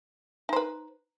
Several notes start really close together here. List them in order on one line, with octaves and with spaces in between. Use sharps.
D#4 C5 B4